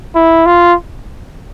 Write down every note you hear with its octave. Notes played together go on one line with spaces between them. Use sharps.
E4
F4